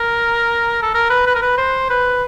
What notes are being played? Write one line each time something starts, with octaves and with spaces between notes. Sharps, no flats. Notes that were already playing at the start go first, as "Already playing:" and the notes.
Already playing: A#4
A4
A#4
B4
B4
A#4
B4
C5
B4